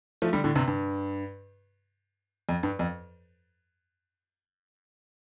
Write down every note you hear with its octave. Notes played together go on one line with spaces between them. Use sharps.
F3 A3
D3 G3
A2 D3
G2 C3
G2
F2
G2
F2